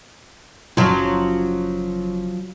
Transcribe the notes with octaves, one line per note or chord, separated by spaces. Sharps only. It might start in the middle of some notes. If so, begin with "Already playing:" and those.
F#1 F3 F#3 C#4 F4